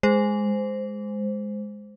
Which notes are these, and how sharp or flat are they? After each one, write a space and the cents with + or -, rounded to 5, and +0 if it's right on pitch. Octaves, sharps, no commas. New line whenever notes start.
G#3 +0 C5 -10